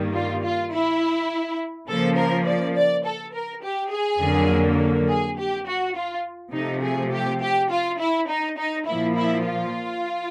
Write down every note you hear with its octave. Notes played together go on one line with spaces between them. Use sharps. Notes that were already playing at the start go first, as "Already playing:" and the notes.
Already playing: G2 D#3 G3 A#3
F4
F4
E4
C#3 F3 A#3 A4
A#4
D5
D5
A4
A#4
G4
G#4
F2 D3 F#3 A#3
G#4
G4
F#4
F4
C3 F3 A3 D#4
G#4
G4
G4
F4
E4
D#4
D#4
A#2 F3 A#3 E4
E4
F4